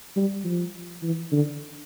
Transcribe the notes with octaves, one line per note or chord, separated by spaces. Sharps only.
G3
F3
E3
D3